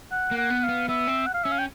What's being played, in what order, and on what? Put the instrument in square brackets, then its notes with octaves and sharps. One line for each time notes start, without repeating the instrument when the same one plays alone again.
[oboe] F#5
[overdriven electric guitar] A#3
[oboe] F#5
[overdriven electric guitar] B3
[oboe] F5
[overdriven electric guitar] B3
[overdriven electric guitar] B3 [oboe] E5
[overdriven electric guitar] C4
[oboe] F#5
F5
[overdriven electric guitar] C#4 [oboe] E5
[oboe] F5
G5